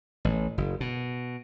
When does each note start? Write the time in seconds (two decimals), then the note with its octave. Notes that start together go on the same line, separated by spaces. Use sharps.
0.25 A1
0.58 F#1
0.80 B2